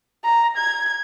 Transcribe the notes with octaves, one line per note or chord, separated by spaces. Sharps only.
A#5
G#6